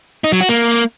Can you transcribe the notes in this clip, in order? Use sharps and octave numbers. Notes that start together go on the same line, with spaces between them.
D#4
F#3
F#4
A#3